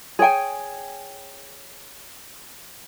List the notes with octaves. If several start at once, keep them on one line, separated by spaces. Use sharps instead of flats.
G#4 C#5 G5 G#5